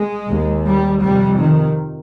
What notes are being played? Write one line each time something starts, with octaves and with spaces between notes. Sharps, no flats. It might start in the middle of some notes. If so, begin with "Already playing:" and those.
Already playing: G#3
D#2
G3
F2 C3 G3
D#3